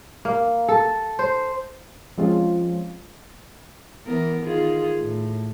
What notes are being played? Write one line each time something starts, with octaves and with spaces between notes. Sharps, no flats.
A#3
A4
C5
F3 G#3 C4 C#4 F4
E3 B3 A#4
D#3 F4 G#4
A2